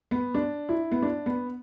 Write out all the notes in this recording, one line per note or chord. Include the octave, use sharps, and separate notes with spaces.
B3
D4
E4
B3
D4
B3